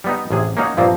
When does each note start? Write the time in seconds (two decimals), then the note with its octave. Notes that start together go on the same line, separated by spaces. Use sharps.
0.04 G3 B3 D#4
0.31 A1 C3 G#4
0.57 A#3 C#4 D#4 F#4
0.77 G2 A#2 F3 A#3 C4